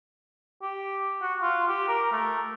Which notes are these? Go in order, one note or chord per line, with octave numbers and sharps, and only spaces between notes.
G4
F#4
F4
G4
A#4
A3